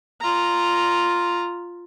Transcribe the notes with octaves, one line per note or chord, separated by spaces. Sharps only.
F4 A#5